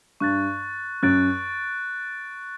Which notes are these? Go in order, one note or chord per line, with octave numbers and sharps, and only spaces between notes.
G2 C#6 F#6 A6
F#2 F#6 A6 D7